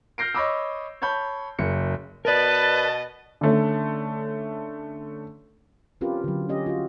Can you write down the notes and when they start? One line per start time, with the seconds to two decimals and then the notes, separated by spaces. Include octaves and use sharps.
0.18 F6 G6 A#6 C7 D7
0.35 C#5 D#5 B5 D6 E6
1.02 C#5 A5 B5 G6
1.59 F#1 C#7
2.25 B2 A#4 B4 D5 D#5 A5
3.41 D3 A3 C#4
6.01 C4 C#4 F4 G4 A#4 B4
6.24 D3 F#3
6.49 C#4 G4 D#5
6.66 F4 F#4